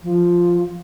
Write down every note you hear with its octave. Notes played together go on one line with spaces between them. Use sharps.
F3